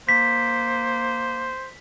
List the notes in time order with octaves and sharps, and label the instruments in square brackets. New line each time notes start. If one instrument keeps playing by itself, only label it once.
[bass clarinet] A#3 [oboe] C5 [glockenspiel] B6